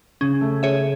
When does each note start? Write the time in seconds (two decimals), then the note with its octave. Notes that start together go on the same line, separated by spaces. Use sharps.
0.21 C#3 C#4
0.41 A3
0.62 C#4 G#4 C#5 E5